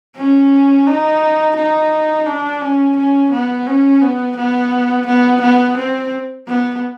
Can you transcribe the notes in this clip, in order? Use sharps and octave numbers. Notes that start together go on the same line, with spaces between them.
C#4
D#4
D#4
D4
C#4
C#4
B3
C#4
B3
B3
B3
B3
C4
B3